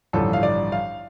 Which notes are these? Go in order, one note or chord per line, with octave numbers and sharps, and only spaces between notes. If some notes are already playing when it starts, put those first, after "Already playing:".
A1 G2 D3 F3 A4
F5
D5
F5